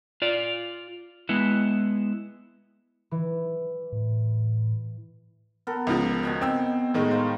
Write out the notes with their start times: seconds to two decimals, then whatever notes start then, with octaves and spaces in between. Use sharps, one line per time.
0.22 F4 D5
1.29 G#3 B3 E4
3.11 E3
3.92 A2
5.67 B3 A4 A#4
5.87 C#2 C#3 F3
6.23 B2 D#3 G#5
6.41 C4 E6
6.94 A2 D#3 G#3
7.11 C5 F5 A#5